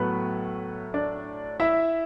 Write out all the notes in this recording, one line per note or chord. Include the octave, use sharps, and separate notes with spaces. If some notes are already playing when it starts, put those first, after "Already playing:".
Already playing: A2 F#3 A3 B3 B4
D4 D5
E4 E5